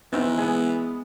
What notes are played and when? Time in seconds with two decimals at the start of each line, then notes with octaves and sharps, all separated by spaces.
0.13 E3 B3 C4 D#4
0.38 G#3 B3 G#5